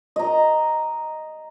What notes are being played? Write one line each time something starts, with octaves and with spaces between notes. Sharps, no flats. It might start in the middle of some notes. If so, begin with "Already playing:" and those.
D#5 A#5